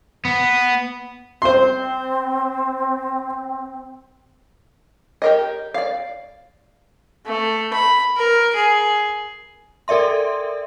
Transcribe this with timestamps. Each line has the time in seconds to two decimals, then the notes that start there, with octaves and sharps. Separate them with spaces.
0.25 B3
1.42 C4 C5 C6
5.22 G4 A#4 D#5
5.74 D5 F5
7.26 A3
7.73 B5
8.16 A#4
8.55 G#4
9.88 A4 A#4 D5 E5 C6